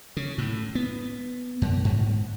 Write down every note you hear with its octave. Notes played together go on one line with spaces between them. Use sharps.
C#3
A2
B3
F#2
G#2